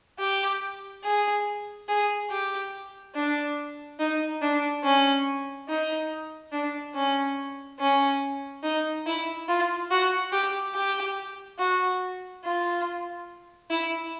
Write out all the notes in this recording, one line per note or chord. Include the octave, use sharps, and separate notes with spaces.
G4
G#4
G#4
G4
D4
D#4
D4
C#4
D#4
D4
C#4
C#4
D#4
E4
F4
F#4
G4
G4
F#4
F4
E4